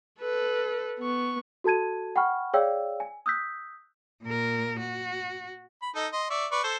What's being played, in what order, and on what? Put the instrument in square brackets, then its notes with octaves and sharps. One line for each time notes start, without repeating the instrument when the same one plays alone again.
[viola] A4 B4
B3 C#6
[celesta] F#4 A4 A5 G#6 D#7
F#5 G5 B5 C#6 F6
G#4 C#5 D5 F5 G5 E6
G#5
D#6 E6 F#6 G6 B6
[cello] A#2 A#4
F#4
[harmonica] B5
D#4 A4 D#5
D#5 C6
D5 E5 C#6
B4 D5 C#6
A4 C5